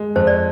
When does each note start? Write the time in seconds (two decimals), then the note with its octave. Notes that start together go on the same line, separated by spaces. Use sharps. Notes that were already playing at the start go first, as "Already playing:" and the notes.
Already playing: G#3
0.15 F2 C5
0.27 D5